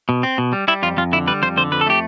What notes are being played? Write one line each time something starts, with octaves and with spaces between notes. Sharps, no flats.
B2
C4
B2
G3
G3 E4
F2 F4
F2 F4
D3 E4
G3 B4
F2 C5
D3 C5
F2 B4
A4
A3 G4